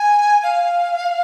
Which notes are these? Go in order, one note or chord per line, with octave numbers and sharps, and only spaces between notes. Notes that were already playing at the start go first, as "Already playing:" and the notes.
Already playing: G#5
F5